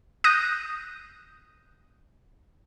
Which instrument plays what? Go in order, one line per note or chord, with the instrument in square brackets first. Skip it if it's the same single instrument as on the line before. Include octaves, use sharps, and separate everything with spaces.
[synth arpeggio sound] D#6 F#6 G6 A#6 D#7